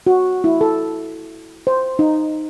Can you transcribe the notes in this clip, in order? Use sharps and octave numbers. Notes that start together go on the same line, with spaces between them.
F#4
E4
A4
C5
D#4